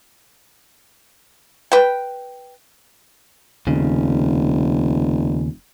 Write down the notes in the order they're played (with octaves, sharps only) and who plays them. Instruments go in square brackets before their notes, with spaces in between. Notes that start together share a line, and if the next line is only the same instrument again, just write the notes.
[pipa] B4 G5
[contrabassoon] F1 [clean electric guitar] D#2 C#3